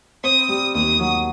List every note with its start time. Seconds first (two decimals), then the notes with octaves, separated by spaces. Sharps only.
0.23 C4 D#6
0.49 G3
0.75 D#2 D#6
1.00 F#3